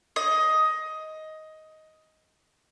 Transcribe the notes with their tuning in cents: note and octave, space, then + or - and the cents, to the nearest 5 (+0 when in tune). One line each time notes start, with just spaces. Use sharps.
D#5 +10